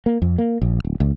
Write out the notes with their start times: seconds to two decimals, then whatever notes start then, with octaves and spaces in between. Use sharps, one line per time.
0.06 A#3
0.22 F2
0.38 A#3
0.62 A#1
0.85 D1
1.00 C#2